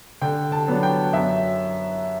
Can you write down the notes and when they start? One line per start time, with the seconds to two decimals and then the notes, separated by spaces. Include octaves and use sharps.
0.21 D3 G5
0.52 A5
0.68 F#3 B3 D4
0.83 G5
1.13 F#2 E5